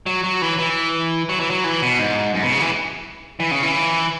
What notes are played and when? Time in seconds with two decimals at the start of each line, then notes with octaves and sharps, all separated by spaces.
0.06 F#3
0.24 F#3
0.42 E3
0.59 E3
1.29 F#3
1.40 E3
1.50 F#3
1.64 E3
1.82 B2
1.99 G#2
2.34 F#2
2.43 B2
2.52 C#3
2.61 E3
3.40 E3
3.51 C#3
3.63 E3